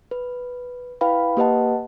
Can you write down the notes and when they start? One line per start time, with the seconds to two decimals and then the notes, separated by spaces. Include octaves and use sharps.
0.11 B4
1.01 E4 B4 F5 G5 B5
1.37 A#3 G4 B4 D#5 F#5 A5